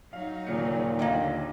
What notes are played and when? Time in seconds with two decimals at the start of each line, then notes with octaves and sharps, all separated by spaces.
0.13 F#3 D#4 F5
0.47 D#1 A#2 C#3 C#7
0.99 D#2 D3 A#3 D#5 G5